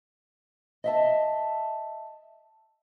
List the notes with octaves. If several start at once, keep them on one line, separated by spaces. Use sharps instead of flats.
D#5 E5 A5